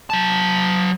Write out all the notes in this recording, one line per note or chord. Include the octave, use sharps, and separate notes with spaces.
F#3 A5